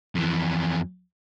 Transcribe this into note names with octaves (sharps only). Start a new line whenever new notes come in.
F2 E3